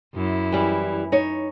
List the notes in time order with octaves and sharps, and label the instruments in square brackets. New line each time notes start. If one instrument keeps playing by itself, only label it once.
[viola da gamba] F#2 E4
[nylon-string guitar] E3 G3
D#4 C#5